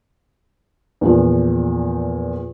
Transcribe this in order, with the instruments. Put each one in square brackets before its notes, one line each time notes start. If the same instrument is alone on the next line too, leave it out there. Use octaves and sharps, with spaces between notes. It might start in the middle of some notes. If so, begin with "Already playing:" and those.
[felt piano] E2 A#2 F3